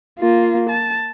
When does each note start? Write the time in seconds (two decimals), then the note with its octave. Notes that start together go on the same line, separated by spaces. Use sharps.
0.19 A#3 F4
0.70 A5